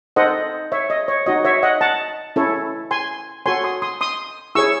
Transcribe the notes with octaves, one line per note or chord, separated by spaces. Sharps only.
D#4 A4 C5 D#5 F#5
C#5 E5
D#5
C#5
D#4 F#4 C#5 D#5
C#5 E5
D#5 F#5
F#5 A5
C#4 E4 A4 C#5
G#5 C6
F#4 A4 C#5 G#5 C6
C6 D#6
C6 D#6
C6 D#6
E4 G#4 C#5 C#6 E6